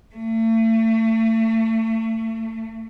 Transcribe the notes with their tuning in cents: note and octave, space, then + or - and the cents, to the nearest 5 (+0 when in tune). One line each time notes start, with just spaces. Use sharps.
A3 +35